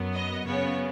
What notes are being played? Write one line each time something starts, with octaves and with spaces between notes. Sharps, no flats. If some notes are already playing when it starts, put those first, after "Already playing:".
Already playing: F#2 F#3 B3
D#5
F#2 C#3 B3 C#5